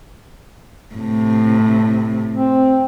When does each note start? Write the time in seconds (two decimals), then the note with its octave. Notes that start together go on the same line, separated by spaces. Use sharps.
0.95 A2 C3
2.35 C4